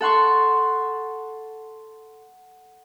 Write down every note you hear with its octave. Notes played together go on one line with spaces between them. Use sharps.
A4 F#5 C6 C#6